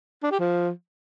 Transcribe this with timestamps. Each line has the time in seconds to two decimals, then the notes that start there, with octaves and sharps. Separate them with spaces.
0.23 D4
0.31 G4
0.39 F3